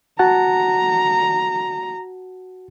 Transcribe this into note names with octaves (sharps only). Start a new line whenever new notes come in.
F#4 F#5 A5 A#5